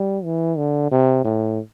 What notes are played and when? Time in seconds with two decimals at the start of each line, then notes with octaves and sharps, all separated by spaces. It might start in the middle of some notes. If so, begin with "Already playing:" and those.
Already playing: G3
0.24 E3
0.57 D3
0.91 C3
1.24 A2